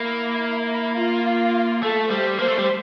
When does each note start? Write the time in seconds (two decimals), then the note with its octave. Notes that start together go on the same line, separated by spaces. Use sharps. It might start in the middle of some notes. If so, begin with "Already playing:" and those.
Already playing: A#3 E4
0.70 E4
0.98 F4
1.83 A3 A4
2.10 G3 C5
2.39 A#3 C5
2.48 A3
2.58 G3